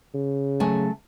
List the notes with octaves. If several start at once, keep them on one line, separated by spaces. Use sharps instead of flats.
C#3
F#3 A3 G#5